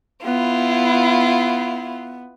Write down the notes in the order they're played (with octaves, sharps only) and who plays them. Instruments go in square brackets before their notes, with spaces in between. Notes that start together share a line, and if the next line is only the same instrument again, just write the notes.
[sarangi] B3 [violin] E4 F4